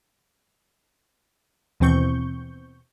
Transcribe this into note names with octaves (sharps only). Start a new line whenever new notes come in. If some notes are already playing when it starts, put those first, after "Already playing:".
D#2 B2 E3 C4 C#6 G6